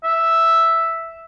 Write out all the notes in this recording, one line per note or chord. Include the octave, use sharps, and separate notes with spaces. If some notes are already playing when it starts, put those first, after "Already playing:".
E5